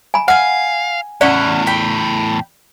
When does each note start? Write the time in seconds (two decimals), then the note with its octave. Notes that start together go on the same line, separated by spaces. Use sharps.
0.14 G#5 B5
0.28 F5 F#5 G#5 F6
1.21 E2 A2 C#4 E4 D5 F#5
1.67 G5 B5